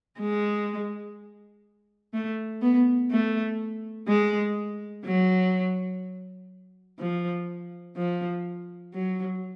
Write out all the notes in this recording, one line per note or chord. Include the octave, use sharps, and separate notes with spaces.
G#3
A3
B3
A3
G#3
F#3
F3
F3
F#3